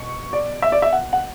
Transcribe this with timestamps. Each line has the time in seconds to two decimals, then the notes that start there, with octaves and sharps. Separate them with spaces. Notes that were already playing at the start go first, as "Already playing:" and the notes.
Already playing: B2 C#6
0.33 D5
0.62 E5
0.72 D5
0.82 E5
0.92 F#5
1.13 F#5